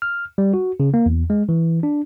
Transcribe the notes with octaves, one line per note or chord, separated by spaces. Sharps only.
F6
G3
F#4
C#3
A#3
E2
G#3
E3
D4